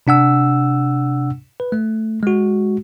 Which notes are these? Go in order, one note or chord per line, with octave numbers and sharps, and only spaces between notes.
C3 D4 F#5 E6
B4
A3
G#3 F#4